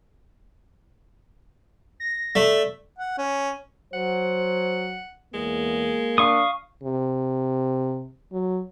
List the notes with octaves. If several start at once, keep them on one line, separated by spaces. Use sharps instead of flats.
A#6
A3 D5
F#5
C#4
F#3 C5 F#5
E2 G#3 A#3
D4 F5 C#6 D#6
C3
F#3